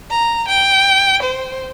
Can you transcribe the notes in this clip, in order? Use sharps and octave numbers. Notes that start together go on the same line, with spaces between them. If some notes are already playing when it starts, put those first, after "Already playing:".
A#5
G5
C5